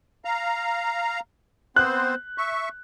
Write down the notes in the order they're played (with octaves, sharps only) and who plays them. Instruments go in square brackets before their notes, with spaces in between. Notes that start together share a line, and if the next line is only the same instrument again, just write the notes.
[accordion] F5 A#5
[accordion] B3 C4 C5 [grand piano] F#6
[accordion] E5 C#6